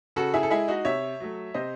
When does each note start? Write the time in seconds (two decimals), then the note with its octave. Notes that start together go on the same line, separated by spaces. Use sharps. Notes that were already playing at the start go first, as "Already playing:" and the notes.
0.16 C#3 F#4 A4
0.34 E4 G#4
0.43 A4
0.50 G#3 E4 G#4
0.68 D#4 F#4
0.85 C3 C#5 E5
1.20 F#3 A3
1.54 C3 C5 D#5